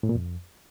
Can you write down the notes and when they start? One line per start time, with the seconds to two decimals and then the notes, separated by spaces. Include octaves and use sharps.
0.03 A2
0.09 A#2
0.15 F2